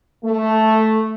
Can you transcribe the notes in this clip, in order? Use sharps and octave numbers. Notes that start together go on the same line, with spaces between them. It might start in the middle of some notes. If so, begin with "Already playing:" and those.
A3